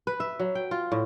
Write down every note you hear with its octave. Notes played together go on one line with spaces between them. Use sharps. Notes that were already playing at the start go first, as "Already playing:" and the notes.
B4
E5
F#3
G5
F4
A2